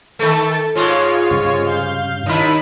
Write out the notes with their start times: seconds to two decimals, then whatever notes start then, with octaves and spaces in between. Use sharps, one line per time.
0.19 D#3 A3 A4
0.75 G#2 G#3 F4 C#5
1.31 G2 C#3
1.66 F5 G6
2.26 D#2 D#4 E4 B5 D#7